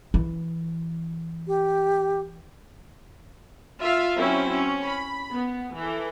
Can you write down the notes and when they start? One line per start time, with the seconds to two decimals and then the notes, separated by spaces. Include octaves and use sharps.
0.14 E3
1.48 G4
3.80 F4 E5 F5
4.17 F#3 C4 C#4 E4
4.49 C#4
4.83 B5
5.32 B3
5.75 E3 A4